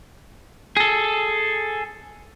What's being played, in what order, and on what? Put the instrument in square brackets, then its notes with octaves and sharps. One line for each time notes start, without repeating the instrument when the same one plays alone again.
[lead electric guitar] G#4 A4